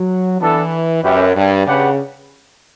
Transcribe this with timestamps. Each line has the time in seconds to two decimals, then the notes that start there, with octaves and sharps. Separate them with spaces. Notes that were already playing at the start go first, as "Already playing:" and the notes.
Already playing: F#3
0.40 E3 B3 D4 A4
1.03 F#2 C#4 G4 B4 E5 G5
1.36 G2
1.66 C#3 D4 G4 B4 F#5